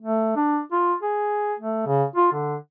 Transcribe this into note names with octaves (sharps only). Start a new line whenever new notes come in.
A3
D4
F4
G#4
A3
C#3
F4
D3